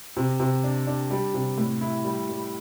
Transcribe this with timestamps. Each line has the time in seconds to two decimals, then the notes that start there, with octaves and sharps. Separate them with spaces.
0.17 C3
0.40 C3
0.64 D4
0.87 D4
1.11 G3
1.34 C3
1.58 A2
1.81 E4
2.05 G3
2.29 G3